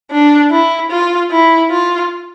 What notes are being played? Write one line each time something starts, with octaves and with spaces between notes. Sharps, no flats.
D4
E4
F4
E4
F4